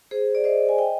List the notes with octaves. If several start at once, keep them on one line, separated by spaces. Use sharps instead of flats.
G#4 C5
D5
C5 D#5
G#5
D#5 G5